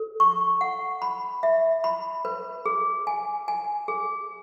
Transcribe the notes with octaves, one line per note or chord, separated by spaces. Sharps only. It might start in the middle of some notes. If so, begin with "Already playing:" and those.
Already playing: A4
C#6
F#5
B5
E5
B5
B4
G#4
G#5
G#5
G#4